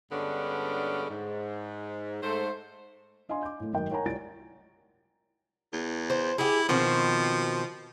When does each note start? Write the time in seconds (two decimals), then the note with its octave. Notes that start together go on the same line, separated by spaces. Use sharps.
0.12 G2 D3 G#3 B3 C#4 D4
1.10 G#2
2.22 G#2 A3 C5
3.29 D4 D#5 F5 G#5 C6
3.43 D6 G6
3.60 A2 A3
3.73 G#1 F#2 A#4 D#5 G5
3.91 A#4 C#5 F#5 G#5 A#5
4.06 C2 F4 C#5 D5 A6 D7
5.73 E2
6.10 C5
6.38 E4 G4 G#4
6.69 B2 D#3 F3 C4